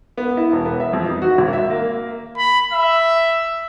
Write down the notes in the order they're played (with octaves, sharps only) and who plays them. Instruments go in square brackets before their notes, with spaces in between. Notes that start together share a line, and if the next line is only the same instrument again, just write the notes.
[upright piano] B3
E4
E1
B3
E5
F2
D#4
F#4
G#1
E5
A#3
[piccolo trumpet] B5
E5